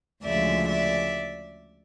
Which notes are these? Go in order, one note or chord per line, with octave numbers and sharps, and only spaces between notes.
D2 C#3 F3 G#3 D5 E5
D5 E5